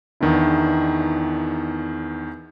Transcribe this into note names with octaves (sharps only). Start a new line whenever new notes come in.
E2 D#3 B3 D4 E4